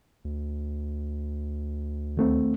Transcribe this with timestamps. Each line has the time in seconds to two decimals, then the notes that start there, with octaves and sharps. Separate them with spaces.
0.25 D2
2.17 D#2 A3 C4